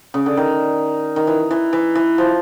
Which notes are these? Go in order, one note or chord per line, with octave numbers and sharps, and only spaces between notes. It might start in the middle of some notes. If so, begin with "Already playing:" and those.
C#3
D3
D#3
D#3
E3
E3
E3
E3
F3